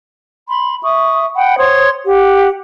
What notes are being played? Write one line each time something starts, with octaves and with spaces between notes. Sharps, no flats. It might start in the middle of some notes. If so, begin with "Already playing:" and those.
B5 C6
E5 C#6 D#6
F#5 G5 B5
C5 C#5 C6 D#6
G4 F#5